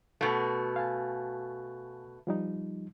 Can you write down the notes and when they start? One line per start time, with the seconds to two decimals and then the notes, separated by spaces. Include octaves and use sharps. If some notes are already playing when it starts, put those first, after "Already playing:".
0.21 B2 A3
0.76 F5 G#5 A5
2.27 F3 G3 D#4